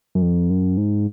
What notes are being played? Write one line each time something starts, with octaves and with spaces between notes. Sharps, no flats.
F#2
F2
F#2
G#2